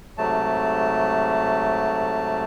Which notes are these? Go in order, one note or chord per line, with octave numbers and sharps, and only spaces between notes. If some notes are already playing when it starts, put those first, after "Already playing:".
G#2 C3 F#3 A3 A5